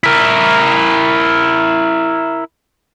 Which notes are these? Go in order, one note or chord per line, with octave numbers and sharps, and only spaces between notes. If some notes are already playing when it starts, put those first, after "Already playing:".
E4 A#4